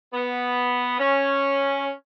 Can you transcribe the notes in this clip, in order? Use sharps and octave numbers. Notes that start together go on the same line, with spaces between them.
B3
C#4